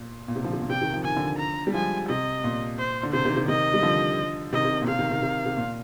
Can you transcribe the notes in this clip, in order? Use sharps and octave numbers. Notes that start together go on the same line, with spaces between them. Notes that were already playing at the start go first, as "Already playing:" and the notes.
Already playing: A#2
A#2
C3
D3 F3
C3
A#2
C3 G5
C3 D#3
F3
D#3 G#5
D3 F3
A#5
G3
F3 G#3 G#5
C3 D#5
A#2
C5
D3
C3 C5
C3 D#3
C3
C3 D#3 D#5
G3
D3 F3
C3 D#3 D#5
C3
A#2
C3 F5
C3 D#3
C3 D#3
C3
C3
A#2